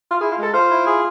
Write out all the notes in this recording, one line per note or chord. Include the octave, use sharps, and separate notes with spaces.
F4
E4 G#4
F4
G#3 A4
F4 C5
E4
G#4